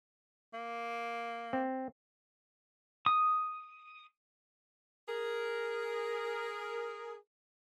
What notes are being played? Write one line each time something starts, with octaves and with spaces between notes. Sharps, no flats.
A#3
C4
D#6
G#4 A#4